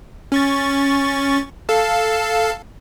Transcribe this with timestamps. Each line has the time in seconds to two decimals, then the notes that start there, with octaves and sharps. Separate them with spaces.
0.32 C#4 C#6 A6
1.69 A4 F5 A5